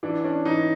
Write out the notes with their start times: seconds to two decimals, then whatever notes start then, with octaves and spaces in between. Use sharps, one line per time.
0.03 E3 D4
0.24 C#4 D4
0.45 E3 D#4